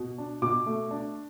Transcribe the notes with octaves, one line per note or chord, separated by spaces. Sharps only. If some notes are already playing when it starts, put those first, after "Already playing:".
Already playing: B2
D4
B2 D6
A3
D4